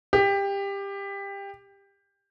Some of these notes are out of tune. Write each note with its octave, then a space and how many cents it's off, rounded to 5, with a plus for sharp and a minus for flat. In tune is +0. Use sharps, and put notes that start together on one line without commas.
G4 +20